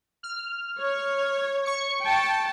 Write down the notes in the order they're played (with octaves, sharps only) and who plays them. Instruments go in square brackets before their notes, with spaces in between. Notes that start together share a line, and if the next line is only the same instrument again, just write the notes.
[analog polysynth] F6
[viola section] C#5
[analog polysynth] C#6 C#7
[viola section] G5 A5